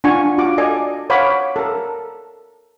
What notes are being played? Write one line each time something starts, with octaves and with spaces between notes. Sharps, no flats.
D4 F4 F#5 G#5 C#6
F4 F#4 D6
A4 D5 D#5 G#5
C5 C#5 F5 F#5 B5 D6
A4 A#4